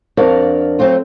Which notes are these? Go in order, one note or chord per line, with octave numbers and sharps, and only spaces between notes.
F2 D4 F#4 A#4 D5 F5
F#3 A3 C4 F4